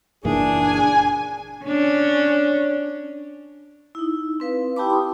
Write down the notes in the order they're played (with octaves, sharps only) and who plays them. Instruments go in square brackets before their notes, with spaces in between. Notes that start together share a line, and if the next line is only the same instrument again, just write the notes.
[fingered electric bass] F#1 A#2 E3 [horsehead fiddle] D4 [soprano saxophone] G#4
[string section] G#5
[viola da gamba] C#4 D4
[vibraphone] D#4 E4
C4 B4 F5
E4 G4 G5 A5 B5 D6
C6 D#6